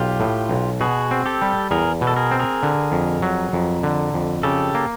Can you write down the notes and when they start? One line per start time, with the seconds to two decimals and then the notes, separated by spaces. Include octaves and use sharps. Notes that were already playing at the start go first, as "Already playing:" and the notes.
Already playing: B1 F4 G4
0.20 A2
0.49 B1
0.81 B2 F#4 G#4
1.11 C4
1.26 G4 A4
1.42 G3
1.71 E2 G#4 A#4
2.01 B2
2.07 A4
2.16 G#4 A#4
2.31 C4
2.39 G#4 A#4
2.63 D3
2.92 F2
3.22 F#3
3.53 F2
3.83 D3
4.14 F2
4.43 C#3 G4 A4
4.75 A#3